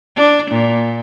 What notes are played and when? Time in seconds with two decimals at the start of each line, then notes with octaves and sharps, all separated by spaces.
0.16 D4
0.51 A#2